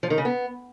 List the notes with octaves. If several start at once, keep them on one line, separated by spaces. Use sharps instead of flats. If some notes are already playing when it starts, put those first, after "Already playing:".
F3
D#3
C#3
B3